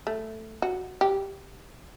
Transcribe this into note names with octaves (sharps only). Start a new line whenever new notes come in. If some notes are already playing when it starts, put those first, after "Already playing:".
A3
F#4
G4